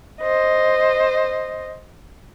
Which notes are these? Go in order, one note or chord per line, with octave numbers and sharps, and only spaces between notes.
C5 D#5